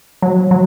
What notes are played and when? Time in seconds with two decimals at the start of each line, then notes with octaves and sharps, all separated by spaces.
0.22 F#3
0.51 F#3